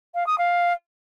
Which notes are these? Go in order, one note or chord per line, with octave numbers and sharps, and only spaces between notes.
F5
D#6
F5